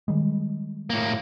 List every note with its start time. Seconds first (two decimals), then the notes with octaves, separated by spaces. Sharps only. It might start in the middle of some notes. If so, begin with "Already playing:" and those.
0.08 D#3 G3 G#3
0.90 A2 A#3